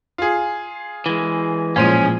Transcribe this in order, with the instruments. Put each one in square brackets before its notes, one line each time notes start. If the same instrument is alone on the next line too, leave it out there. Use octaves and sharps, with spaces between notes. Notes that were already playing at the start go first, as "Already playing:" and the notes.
[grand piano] F4 G#4
[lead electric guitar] E3 G#3
[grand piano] A1 C5 D#7 [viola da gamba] A#2 F3 G#3 [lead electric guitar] C#4